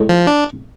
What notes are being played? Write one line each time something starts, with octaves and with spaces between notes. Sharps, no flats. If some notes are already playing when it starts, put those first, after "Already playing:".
Already playing: A2 G#3
F3
D4